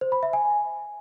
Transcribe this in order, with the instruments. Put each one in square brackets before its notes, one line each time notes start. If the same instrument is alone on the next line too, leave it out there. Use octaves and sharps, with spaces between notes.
[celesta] C5
B5
E5
G#5